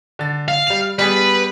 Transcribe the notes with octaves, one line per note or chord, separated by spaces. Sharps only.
D3 A6
F5
G3 F7
G3 B3 G#4 B4